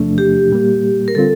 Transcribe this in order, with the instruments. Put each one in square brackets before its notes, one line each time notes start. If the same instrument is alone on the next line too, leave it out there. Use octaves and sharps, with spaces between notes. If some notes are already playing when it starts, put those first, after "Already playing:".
Already playing: [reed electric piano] E2 C3 F3 A3 D4
[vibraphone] G4
[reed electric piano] A#2 G3 A#3
[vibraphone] A#4
[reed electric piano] D3 G3 C4 F4 [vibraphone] A4